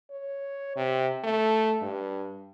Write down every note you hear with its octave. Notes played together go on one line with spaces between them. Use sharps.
C#5
C3
A3
G2